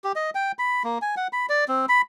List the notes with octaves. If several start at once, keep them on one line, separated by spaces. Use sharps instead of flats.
G4
D#5
G5
B5
A#3
G#5
F#5
B5
D5
C4
B5